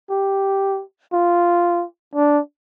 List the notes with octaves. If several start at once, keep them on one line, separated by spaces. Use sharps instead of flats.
G4
F4
D4